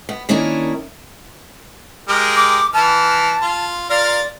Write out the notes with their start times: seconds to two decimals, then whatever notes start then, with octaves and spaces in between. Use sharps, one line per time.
0.09 B3
0.29 D#3 A#3 C#4 D4 E4 A#4
2.08 G#3 G4 A#4
2.36 D6
2.74 E3 A5 F6
3.42 F4
3.90 F4 A#4 D5 F5